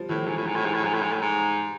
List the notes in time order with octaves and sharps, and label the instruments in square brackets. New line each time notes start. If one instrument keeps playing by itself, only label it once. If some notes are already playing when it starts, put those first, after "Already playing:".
Already playing: [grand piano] F3 G3
[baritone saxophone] A2 [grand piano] E3
[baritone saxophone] G#2 [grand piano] F3
[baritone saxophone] A2
[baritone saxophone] G#2 [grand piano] F3
[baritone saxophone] A2
G#2
A2
[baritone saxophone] G#2 [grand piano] F3
[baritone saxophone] A2
G#2
A2
G#2